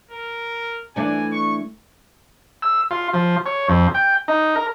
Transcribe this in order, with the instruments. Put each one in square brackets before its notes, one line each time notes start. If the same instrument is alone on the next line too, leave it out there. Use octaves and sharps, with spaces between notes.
[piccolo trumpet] A#4
[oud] E3 A3 D4 [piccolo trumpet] G#5
[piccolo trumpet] C#6
[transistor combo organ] E6
F4
F3
C#5
F2
G5
D#4
A#4